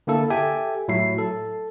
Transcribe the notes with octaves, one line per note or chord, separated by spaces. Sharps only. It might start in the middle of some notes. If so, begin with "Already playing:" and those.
D3 A#3 E4 A4
G4 A4 E5 G5 G#5
A2 F#3 E4 E5 C7
A4